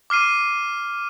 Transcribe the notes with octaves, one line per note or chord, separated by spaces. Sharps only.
D6 F6 C7 D#7